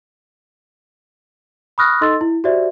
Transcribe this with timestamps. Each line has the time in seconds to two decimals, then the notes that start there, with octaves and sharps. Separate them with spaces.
1.78 B5 C#6 D#6 F6 F#6 A#6
2.01 D#4 A4 D#5 C6 E6 A6
2.21 E4
2.44 F#4 G4 C5 D5 E5